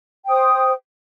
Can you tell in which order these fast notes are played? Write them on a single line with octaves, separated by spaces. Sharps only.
G5 C5 D#6